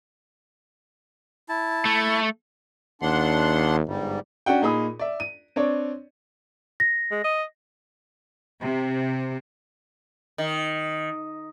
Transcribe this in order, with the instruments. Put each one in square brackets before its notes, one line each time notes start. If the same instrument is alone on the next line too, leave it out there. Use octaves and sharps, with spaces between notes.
[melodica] E4 A5
[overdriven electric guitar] A3
[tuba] D#2 [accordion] D4 F#5 C6
[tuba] G1 [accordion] G#2 G3
[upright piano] C#4 D4 F#4 F#5 G5
A#2 D#4 G#4 B5 D#6
D5 E5
D#7
C4 D4 C#5 D5
[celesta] A#6
[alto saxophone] G#3
D#5
[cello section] C3
[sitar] D#3